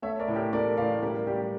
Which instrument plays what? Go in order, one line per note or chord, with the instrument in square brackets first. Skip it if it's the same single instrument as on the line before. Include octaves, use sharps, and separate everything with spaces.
[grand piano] A3 C#5 E5
A#4 D5
A2
G4 A#4
A3 A#4 D5
A2 D5 F5
G3 G4 A#4
G3 G4